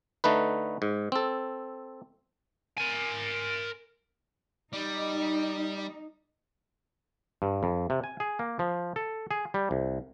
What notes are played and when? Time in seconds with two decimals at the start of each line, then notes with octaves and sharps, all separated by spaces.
0.24 D3 A3 D#4 B4
0.82 G#2
1.12 C4 A4
2.78 A#4 G#5
4.73 G3 D#4
7.42 G2
7.63 F2
7.90 C3
8.04 G#5
8.20 G#4
8.39 A#3
8.59 F3
8.96 A4
9.31 G#4
9.54 G3
9.71 C2